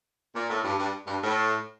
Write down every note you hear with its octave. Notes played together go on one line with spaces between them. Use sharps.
A#2
A2
G2
G2
G2
A2